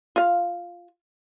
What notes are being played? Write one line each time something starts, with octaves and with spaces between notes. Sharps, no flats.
F4 F5